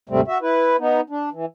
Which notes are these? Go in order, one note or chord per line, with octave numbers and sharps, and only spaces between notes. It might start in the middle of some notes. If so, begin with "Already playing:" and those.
D#2 G#2 C3 G3 A3 C4
F#4 E5
E4 B4
B3 D#4
D4
E3